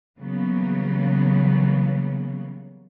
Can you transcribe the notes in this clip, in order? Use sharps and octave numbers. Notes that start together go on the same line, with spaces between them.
C#3 E3 F#3 G3 A#3 B3